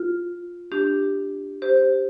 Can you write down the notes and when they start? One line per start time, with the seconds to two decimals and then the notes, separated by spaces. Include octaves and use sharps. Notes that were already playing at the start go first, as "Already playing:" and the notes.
Already playing: F4
0.72 D4 G4
1.62 G4 C5